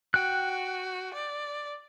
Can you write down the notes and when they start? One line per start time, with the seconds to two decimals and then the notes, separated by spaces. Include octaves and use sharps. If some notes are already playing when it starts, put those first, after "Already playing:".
0.14 F#4 G5 F#6
1.14 D5